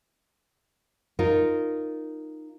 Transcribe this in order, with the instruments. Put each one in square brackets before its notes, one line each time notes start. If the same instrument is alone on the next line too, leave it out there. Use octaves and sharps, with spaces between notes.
[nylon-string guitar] D#4 F4 A#4